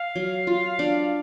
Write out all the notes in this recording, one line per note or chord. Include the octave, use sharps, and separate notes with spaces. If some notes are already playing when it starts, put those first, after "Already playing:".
Already playing: F5
F#3
F4
D4